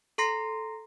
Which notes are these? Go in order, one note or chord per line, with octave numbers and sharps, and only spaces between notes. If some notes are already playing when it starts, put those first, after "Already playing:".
A4 A#5 C6 A#6 C7